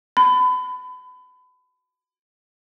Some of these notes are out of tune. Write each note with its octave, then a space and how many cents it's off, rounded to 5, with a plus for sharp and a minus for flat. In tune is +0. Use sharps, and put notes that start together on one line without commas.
B5 +30